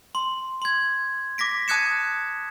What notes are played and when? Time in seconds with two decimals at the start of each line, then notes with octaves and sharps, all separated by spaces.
0.15 C6
0.62 C6 G#6
1.38 D6 A#6 B6 D7
1.68 A5 D#6 F#6 G#6 C#7 E7